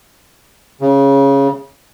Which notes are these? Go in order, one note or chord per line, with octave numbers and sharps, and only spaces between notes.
C#3